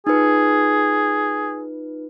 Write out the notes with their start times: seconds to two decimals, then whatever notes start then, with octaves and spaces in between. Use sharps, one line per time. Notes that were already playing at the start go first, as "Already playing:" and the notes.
0.07 D#4 F4 G#4 B4